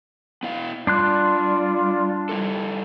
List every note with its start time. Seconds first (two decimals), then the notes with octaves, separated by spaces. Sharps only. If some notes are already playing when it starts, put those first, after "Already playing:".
0.43 B3 E4 F5
0.87 G3 D4 F4 C6 F#6
2.29 G3 E4 A4